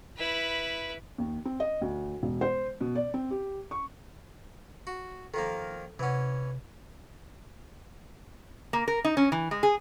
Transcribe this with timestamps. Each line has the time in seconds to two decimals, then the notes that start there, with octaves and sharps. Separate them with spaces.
0.17 E4 B4
1.18 D#2
1.45 C4
1.60 D#5
1.81 D2
2.23 E1
2.41 C5
2.81 B2
2.95 D5
3.14 C4
3.31 G4
3.71 C#6
4.87 F#4
5.34 D#3 F3 A#3 A4
5.99 C3 E3 C#4 F#5
8.73 A#3
8.88 A#4
9.05 D#4
9.17 C#4
9.32 E3
9.51 G#3
9.63 G#4